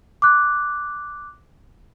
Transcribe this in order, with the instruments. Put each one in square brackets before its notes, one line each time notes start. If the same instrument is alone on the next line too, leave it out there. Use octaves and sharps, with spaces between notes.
[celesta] D6 F#6